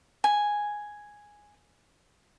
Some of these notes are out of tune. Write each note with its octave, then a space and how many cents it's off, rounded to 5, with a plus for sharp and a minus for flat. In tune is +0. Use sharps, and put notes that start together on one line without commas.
G#5 +0